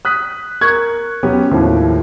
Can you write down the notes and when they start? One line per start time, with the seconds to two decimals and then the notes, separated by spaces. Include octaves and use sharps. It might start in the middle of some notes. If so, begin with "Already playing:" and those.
0.05 D#6 F#6 B6
0.61 A#4 C#6 F#6 G#6
1.23 F#3 B3 C#4 G4
1.51 D#2 A2 F3